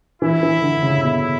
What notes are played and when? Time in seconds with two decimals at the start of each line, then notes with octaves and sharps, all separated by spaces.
0.22 E3 E4
0.43 E3
0.62 D3
0.83 C#3
1.03 B2 E4